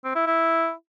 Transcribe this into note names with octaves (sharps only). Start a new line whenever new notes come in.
C4
E4
E4